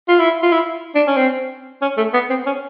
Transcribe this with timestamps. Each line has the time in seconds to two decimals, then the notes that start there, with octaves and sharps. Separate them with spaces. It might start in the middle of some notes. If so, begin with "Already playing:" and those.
0.08 F4
0.20 E4
0.43 F4
0.52 E4
0.95 D4
1.07 C#4
1.17 C4
1.82 C#4
1.97 A3
2.14 B3
2.30 C4
2.46 C#4